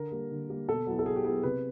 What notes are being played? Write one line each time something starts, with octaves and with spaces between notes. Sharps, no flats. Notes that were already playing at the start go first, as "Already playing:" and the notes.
Already playing: D3 A#4
G3 A#3
D3
G3 A#3
B2 A4
F#3 B3 E4
A4
B2 G#4
G4
F#3 B3 E4 G#4
C3 B4